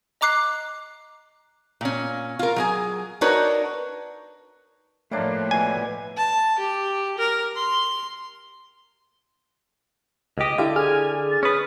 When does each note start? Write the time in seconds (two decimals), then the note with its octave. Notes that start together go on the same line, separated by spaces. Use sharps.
0.21 D#5 A#5 D6 F#6 C7
1.81 A#2 C#4
2.39 F4 A#4
2.56 F#3 G#4 G#5
3.21 D4 D#4 F#4 A#4 B4 C#5
5.11 A2 F3 G3 A3 A#3 D4 C#5
5.51 B2 E3 G#5
6.17 A5
6.59 G4
7.18 A#4
7.56 C6
10.38 C#2 G4 D#5
10.58 D3 E4 G4 F5
10.76 G#4 G#5 F6
11.31 A6
11.43 C#4 B4 D#6